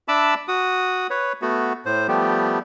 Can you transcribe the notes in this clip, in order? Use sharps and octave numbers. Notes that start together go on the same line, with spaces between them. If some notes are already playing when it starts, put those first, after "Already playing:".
D4 E5 A5 B5 D6 E6
F#4 D#6
B4 C#5
A3 B3 F#4
A2 C5
F3 G3 A3 B3 G4